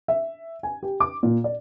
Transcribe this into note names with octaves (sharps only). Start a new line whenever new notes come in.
E5
G#5
G4
D6
A#2
D5